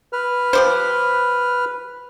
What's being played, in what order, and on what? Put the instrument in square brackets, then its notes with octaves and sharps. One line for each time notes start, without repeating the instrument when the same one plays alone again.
[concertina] B4 F6
[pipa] F3 G4 C5